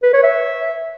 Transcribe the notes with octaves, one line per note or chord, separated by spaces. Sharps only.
B4
C#5
E5